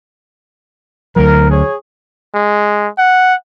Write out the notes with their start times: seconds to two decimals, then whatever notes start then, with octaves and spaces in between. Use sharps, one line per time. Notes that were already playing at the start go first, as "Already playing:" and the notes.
1.16 D2 F#3 A#4
1.51 G#4 C#5
2.34 G#3
2.98 F#5